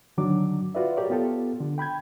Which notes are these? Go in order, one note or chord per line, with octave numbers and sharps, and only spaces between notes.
G2 D3 D#3 F#3 D4 D6
F4 F#4 B4 D5 E5
G4 A#4 C#5 D5
B3 F4 G4 A4
D3
G5 B5 G6 G#6